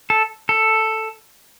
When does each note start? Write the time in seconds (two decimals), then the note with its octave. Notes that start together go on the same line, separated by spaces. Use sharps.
0.10 A4
0.49 A4